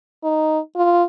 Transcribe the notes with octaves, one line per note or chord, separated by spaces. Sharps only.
D#4
F4